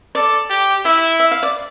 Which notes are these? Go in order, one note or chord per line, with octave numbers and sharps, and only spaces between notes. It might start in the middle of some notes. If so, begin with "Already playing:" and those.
A4 D5
G4
E4 E5
E5
F5
D5